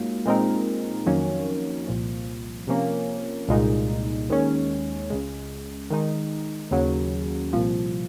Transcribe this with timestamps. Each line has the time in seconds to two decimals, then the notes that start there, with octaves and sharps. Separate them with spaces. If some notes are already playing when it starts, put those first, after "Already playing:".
Already playing: G#2 F#3 A#3 F4
0.25 A#2 G#3 C4 D#4 A#4
1.06 F2 D#3 F#3 A#3 C#4
1.87 C2 A#2 F3
2.67 C3 F3 A#3 C#4
3.49 C2 A#2 G#3 D#4
4.29 D#2 D#3 G#3 C#4
5.10 C#2 C#3 G#3
5.90 D#3 G#3 D#4
6.71 D#2 C#3 F#3
7.53 C2 A#2 F3